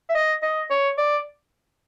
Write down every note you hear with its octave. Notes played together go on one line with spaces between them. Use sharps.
E5
D#5
D#5
C#5
D5